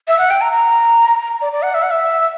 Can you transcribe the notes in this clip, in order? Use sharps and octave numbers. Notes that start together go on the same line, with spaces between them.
E5
F#5
G5
A#5
A#5
D5
D5
F#5
E5
F#5
E5